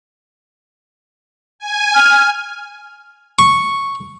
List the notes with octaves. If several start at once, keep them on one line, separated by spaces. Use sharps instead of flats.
G#5
F6
C#6